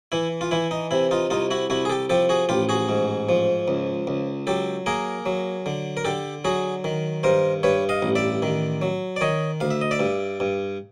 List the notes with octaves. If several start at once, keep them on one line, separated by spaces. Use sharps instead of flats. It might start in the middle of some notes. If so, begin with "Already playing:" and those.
E3 E4
F4
E3 E4
D#4
C3 E4
D#4 F4
C2 D#4 F4
E4 F#4
C2 E4 F#4
G#4
G4 A4
F3 G4 A4
F#4 G#4
A1 F4 G4
F#4 G#4
G#2
F3
C#2
C#2
F#3 G4 A4
A#3 G#4 A#4
F#3
D3
A#4
D3 G4 A4
F#3 F#4 G#4
D#3
G2 A#4 C5
G2 B4 C#5
D#5 F5
A1
D5 E5
D#3
F#3
D5
D#3 C#5 D#5
D2 F5
E5
D#5
D5 E5
G2
G2